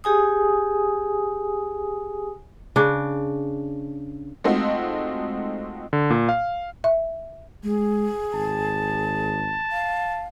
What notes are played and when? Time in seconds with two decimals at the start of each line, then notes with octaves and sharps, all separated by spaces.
0.04 G4 G#4 G#5 D#6
2.76 C#3 D4
4.44 G#3 A3 C4 D#4 F4 F#4
5.93 D3
6.10 A#2
6.29 F5
6.84 E5
7.64 G#3 G#4
8.34 G#1 A5
9.71 F5